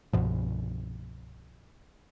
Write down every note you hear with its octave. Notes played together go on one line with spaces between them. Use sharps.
C2 G2 B2 F3